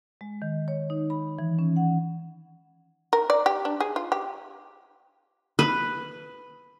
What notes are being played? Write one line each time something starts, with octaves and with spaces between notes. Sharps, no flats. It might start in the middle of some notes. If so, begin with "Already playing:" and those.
G#3
D#3
C#5
D#4
B5
E3
C#4
F#5
A#4
D5
G4
D4
G#4
F4
G4
B4